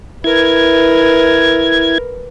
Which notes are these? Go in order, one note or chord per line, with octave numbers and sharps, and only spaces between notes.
E4 A#4 B4 G#6